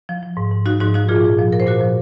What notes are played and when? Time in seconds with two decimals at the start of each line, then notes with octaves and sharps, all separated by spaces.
0.09 F3
0.23 F3
0.37 G#2
0.51 G#2
0.66 F3 D#4 F#4
0.80 G#2 D#4 F#4
0.94 F3 D#4 F#4
1.09 A#2 F4 G#4
1.24 F3
1.38 F3
1.52 F3 A#4
1.60 C5
1.66 A#2 F#4 A#4
1.81 F3